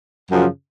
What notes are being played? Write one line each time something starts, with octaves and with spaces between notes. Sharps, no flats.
F#2 C#3 F3